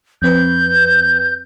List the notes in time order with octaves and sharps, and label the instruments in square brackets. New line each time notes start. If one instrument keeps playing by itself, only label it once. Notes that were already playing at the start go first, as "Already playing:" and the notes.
[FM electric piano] F2 C4 B4 [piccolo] G6